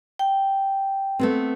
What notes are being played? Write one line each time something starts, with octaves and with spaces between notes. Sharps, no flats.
G5
A3 B3 C4